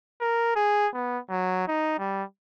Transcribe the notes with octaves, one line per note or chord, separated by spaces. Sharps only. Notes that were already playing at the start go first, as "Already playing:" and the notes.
A#4
G#4
B3
F#3
D#4
G3